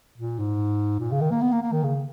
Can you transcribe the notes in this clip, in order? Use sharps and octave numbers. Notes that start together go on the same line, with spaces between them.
A#2
G#2
A#2
C#3
D#3
A#3
B3
A#3
A#3
D#3
C#3